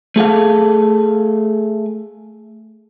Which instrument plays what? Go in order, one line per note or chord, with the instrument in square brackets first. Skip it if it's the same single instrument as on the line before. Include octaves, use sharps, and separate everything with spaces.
[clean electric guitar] A3 G#4 A4 F5